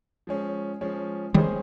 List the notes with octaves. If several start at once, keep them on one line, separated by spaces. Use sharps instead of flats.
F3 G#3 C#4
F3 G#3 C#4
D#3 G3 G#3 C#4 G#4 C5